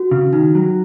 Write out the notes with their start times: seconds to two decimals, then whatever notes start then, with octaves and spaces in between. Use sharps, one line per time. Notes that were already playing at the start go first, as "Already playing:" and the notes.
Already playing: F#4
0.11 C#3
0.33 D#3 D#4
0.55 F#3